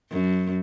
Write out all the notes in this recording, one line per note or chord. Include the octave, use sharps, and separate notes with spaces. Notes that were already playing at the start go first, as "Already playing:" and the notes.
F#2